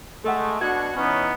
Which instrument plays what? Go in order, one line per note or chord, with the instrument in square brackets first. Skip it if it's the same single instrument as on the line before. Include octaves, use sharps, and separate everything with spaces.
[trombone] G#3 [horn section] A3 [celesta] A4 F#5
[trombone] B2 [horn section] D4 F#4 F#5 [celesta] G#6
[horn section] E3 C#4 [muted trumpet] B3 [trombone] D#4